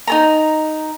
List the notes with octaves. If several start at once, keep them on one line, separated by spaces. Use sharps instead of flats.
D#4 A4 A#5